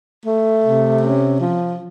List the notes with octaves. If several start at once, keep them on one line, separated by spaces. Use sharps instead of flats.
A3
C3
C#4
F3